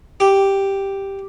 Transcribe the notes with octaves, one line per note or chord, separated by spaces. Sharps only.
G4